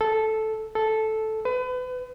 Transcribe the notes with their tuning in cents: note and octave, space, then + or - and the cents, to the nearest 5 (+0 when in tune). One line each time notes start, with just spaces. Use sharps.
A4 -5
A4 -5
B4 +35